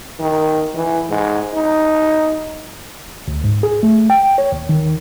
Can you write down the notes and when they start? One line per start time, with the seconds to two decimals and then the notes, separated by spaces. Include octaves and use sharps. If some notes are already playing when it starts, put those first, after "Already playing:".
0.19 D#3
0.74 E3
1.09 G#2
1.54 D#4
3.28 D2
3.44 G#2
3.63 G#4
3.83 A3
4.10 G5
4.38 C#5
4.52 D#2
4.69 D#3